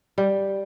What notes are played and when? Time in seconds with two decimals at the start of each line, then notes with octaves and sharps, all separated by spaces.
0.18 G3